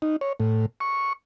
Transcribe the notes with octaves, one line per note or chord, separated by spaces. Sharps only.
D#4
C#5
A2
C#6